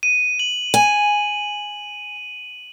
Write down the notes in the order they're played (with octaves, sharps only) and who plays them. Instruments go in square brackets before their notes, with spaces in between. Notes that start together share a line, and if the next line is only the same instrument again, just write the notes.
[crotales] D#7
F#7
[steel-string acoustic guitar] G#5